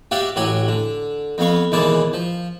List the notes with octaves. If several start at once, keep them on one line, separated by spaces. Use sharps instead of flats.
F#4 G4 D5 E5 F5
A1 F#3 F#4 G4 G#5
D3
F2 B3 F5 C#6
D#2 B2 E3 G#3 D5 A5
F3